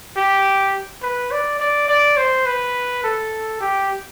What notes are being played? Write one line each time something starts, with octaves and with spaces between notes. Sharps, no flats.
G4
B4
D5
D5
D5
C5
B4
A4
G4